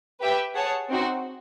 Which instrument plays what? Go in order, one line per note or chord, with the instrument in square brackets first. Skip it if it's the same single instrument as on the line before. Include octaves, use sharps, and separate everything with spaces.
[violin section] G4 B4 E5 G5
G#4 C#5 F#5 A5
C4 D#4 F#4